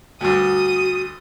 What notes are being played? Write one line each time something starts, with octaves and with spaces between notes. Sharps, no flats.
D2 G2 F#4 D#6